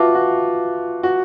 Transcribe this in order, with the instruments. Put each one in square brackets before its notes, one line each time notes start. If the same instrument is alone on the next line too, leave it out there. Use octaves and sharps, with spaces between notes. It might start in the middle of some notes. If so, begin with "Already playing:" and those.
Already playing: [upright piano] F4 F#4 [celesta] B4 E5 A5 D6
[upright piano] F#4
F#4